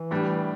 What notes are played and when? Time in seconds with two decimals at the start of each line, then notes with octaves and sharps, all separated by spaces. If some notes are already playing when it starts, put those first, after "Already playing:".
Already playing: E3
0.11 A2 G3 D4